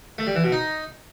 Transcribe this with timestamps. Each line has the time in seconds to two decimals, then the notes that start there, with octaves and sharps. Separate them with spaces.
0.18 A3
0.27 G3
0.35 E3
0.44 B2
0.52 D#4